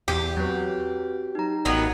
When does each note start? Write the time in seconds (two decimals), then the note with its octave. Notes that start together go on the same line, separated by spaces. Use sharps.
0.08 E2 G4
0.37 F#3 C4 B4
1.35 D#4 A#5
1.65 A1 D#3 F#3 B3